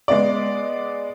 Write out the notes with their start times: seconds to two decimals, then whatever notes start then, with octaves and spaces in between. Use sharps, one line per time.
0.08 G#3 B3 D5